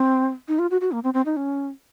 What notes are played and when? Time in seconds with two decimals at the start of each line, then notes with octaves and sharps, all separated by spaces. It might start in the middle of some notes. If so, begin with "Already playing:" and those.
Already playing: C4
0.48 D#4
0.59 F4
0.71 F#4
0.81 F#4
0.92 A#3
1.04 C4
1.14 C4
1.25 D#4
1.36 C#4